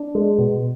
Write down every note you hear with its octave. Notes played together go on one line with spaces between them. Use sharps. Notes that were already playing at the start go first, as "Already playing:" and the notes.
Already playing: D4
G#3
B2